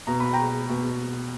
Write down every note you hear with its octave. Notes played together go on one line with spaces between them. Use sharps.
B2 A#5
B5
G5 A#5
B2